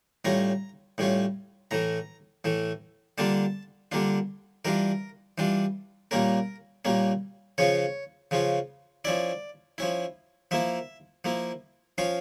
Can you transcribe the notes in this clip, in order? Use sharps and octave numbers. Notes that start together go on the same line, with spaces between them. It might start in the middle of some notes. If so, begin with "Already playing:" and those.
A2 G3 C#4 F4 A#5
A2 G3 C#4 F4
A2 E3 A3 A#5
A2 E3 A3
D3 G3 A#3 D4 F4 A5
D3 G3 A#3 D4 F4
E3 G3 D4 F4 A#4
E3 G3 D4 F4
A#2 G3 A#3 C#4 A#4
A#2 G3 A#3 C#4
C#3 F3 C#4 F4 C#5
C#3 F3 C#4 F4
F3 C#4 E4 D5
F3 C#4 E4
F3 A#3 E4 E5
F3 A#3 E4
F3 C#4 F4 F5